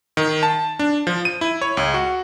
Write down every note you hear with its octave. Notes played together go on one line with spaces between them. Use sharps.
D#3
A5
D4
F3
D#7
E4
C#5
C#2
F#4